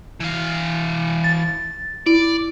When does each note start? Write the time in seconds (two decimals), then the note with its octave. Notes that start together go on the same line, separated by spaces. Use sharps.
0.20 E3 F5
1.24 A6
2.06 E4 D5